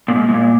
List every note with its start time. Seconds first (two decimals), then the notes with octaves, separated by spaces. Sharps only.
0.08 A#2
0.15 G#2
0.29 G#2
0.34 A#2